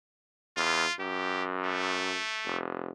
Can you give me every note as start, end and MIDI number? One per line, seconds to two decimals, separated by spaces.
0.57 0.85 40
0.57 0.94 65
1.00 2.20 42
1.00 1.44 67
1.64 2.58 57
2.45 2.91 29